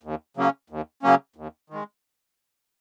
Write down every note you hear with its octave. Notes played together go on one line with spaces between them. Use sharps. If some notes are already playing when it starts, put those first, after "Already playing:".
D#2
C#3 F#3 A#3 C#4
D#2
C#3 F#3 A#3 C#4
D#2
D#3 G#3